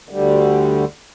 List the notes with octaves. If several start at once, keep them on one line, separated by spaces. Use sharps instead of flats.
D2 D3 G3